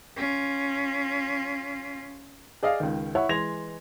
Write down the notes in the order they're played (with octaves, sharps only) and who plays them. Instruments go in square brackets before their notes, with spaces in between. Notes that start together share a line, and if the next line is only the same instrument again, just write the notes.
[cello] C#4 F4
[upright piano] G#4 D5 D#5 F5
C#2 D#3
E4 C#5 F#5
E3 G#3 C6 G#6 A#6 F7